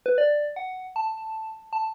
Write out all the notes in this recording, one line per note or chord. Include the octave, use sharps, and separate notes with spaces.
B4
D5
F#5
A5
A5